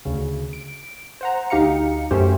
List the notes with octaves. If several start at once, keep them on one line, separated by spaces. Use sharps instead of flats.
D2 C#3
D7
C5 F#5 A#5
D2 D#4 G4 F5 A#5 C#7
F#2 A3 C#4 G4 C5